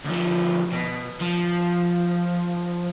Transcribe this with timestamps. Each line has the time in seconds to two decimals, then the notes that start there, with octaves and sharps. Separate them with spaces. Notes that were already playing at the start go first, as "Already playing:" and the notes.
0.05 D2 F3
0.73 B2
1.21 F3